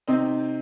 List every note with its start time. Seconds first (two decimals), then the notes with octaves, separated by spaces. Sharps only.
0.08 C3 C4 D#4